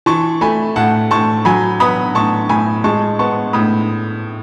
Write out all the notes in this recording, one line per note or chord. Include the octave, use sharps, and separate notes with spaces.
E3 A5 C#6
A3 G#5 B5
A2 F#5 A5
A2 A5 C#6
F#3 G#5 B5
B3 B5 D#6
A2 A5 C#6
A2 G#5 B5
G#3 A5 C#6
B3 A5 C#6
A2 B5 D#6